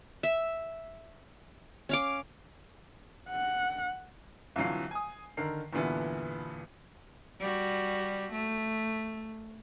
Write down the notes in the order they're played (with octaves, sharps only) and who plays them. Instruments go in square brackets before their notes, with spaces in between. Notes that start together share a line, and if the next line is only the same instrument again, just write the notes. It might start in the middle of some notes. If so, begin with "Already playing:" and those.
[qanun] E5
C#4 F5 D6
[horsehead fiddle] F#5
[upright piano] C2 D3 E3 F#3 F4 C7
G#5 D#6
D3 D#3 A#4 C7
E2 G2 A#2 D3 B3 E4
[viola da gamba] G3 F#4
A3